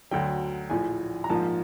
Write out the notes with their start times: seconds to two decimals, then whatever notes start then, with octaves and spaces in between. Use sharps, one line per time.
0.11 D2 D3 F#3 G5
0.70 A#1 A2 F3 G#5
1.24 A#5
1.30 A#1 G#2 F3 A#3 A5